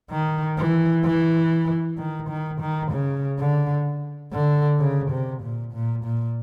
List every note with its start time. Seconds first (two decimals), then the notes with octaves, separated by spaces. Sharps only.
0.11 D#3
0.58 E3
1.04 E3
1.98 D#3
2.29 D#3
2.60 D#3
2.91 C#3
3.39 D3
4.33 D3
4.79 C#3
5.10 C3
5.42 A#2
5.73 A#2
6.04 A#2